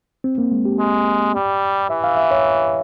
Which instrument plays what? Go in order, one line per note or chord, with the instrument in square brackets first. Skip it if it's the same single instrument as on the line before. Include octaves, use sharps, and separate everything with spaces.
[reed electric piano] C4
A#3
G#3
G4
[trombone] G#3
G3
[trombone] E3 [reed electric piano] E5
[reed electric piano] F5
E5
C#5